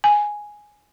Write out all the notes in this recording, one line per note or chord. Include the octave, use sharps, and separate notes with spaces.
G#5